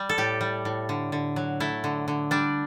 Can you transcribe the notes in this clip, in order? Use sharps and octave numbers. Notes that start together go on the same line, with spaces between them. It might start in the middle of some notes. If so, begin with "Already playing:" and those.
Already playing: G3
A4
A2 G4
G3
A2
D3
D3
F#3
A3 E4
D3
D3
G3 D4